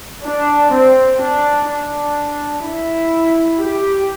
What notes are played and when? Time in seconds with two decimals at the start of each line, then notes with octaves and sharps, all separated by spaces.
0.25 D4
0.73 C4
1.21 D4
1.68 D4
2.65 E4
3.60 G4